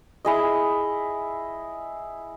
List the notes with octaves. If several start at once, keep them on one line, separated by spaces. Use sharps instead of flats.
E4 G#4 D#5